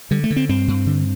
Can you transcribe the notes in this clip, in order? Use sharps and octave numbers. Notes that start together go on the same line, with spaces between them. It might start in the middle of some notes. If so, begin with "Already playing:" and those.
D3 G3
A3
D3
C4
G2 C4
G2
D3